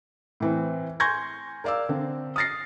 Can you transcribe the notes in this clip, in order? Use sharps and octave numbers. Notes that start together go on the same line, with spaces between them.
A2 E3 C4
G#5 C6 C#6 G6 G#6 A#6
A#4 D5 F5 D6 E6
D3 C4
D#6 F6 A6 A#6 C7